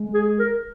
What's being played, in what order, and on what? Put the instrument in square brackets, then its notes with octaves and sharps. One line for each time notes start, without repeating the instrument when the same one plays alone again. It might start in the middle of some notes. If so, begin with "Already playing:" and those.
Already playing: [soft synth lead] G#3
[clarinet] G#4
A#4